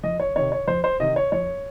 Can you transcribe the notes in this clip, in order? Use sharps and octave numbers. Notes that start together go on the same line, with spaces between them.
F2 D#5
C#5
C3 D#3 C#5
C#5
F2 C5
C5
C3 D#3 D#5
C#5
F2 C#5